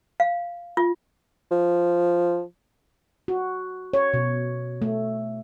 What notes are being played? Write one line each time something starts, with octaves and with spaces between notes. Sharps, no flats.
F5
F4
F3
F#4
C#5
B2
A3